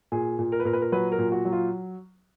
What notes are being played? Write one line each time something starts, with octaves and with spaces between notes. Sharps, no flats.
A#2 G#4
A#2
A#4
B4
A#2 A#4
B4
A#4
F#3 B4
A#4
A#2
F#4
F#3
F4